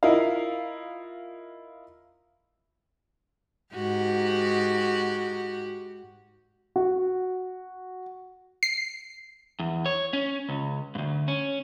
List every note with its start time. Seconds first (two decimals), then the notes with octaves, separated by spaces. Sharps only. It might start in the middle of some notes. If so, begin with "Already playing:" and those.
0.03 E4 F4 A#4 D#5 F5
3.75 G#2 F#4 G4
6.76 F#4
8.63 C7
9.59 E2
9.86 C#5
10.13 C#4
10.49 C#2
10.95 D2 G2
11.28 C#4